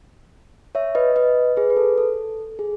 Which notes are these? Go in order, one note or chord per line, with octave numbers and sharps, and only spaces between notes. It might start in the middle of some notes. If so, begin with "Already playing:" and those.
C#5 E5
B4 D#5
B4 D#5
G#4 B4
B4
A4
A4
G#4